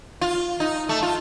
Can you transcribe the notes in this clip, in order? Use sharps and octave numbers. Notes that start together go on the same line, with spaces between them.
F4
D#4
A3
F4